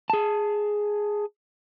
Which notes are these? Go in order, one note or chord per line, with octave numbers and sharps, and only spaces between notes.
G#4 A5